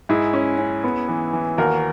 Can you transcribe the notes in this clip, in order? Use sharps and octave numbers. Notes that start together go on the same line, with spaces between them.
G#2 E4 G#4
C#4
C#4
B3
E3
E3
D#2 F#4 A#4